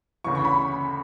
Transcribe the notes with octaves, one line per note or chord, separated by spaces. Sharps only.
D2 C#3 E3 C#6
C#6
B5